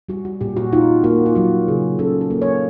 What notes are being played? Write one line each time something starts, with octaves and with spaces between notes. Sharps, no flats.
G3 F#4
F#4
A#2 G4
F#4
D#4 F4
A#3 F#4
F4
F#3 F#4
C#3 G#4
C#4 A4
A4
A#3
C#5